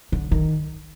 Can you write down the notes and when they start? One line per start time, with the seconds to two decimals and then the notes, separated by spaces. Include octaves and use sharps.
0.12 D3
0.32 D#3